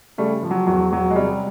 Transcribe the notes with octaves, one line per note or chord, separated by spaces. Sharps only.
C#3 G3 A3
F3
F#3
E2 F#3
E1 F#3
G#3
C3 G3